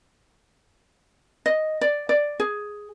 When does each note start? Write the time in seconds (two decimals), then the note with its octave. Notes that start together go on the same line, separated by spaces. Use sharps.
1.46 D#5
1.81 D5
2.09 D5
2.40 G#4